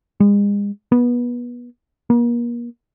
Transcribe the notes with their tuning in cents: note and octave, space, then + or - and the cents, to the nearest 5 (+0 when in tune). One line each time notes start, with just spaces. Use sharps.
G#3 -40
B3 -25
A#3 +35